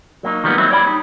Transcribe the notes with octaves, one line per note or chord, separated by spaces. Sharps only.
F#3 A#3 D4 D#4
D#3 F3 G3 G#3 A#3 B3
F#3 A#3 C4 D#4 E4
C#5 D5 F#5 B5
G3 D#4